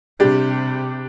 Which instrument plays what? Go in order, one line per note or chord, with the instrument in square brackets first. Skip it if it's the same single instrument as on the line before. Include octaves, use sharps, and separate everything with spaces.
[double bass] C3 [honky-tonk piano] G3 D4 G4